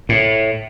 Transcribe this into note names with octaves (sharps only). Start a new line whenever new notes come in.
A2